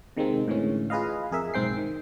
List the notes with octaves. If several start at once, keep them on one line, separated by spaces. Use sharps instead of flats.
C3 D#3 G#3 A#3 C4
A2 D3 E3 G#3 C#4
F4 G#4 B4 D#5 F5
F2 G#4 A#4 E5
B1 G#2 C4 G5 C7
D#3